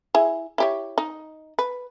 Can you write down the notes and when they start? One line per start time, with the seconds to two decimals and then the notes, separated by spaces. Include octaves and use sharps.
0.14 E4 G#4
0.58 E4 G4 C#5
0.98 D#4
1.59 B4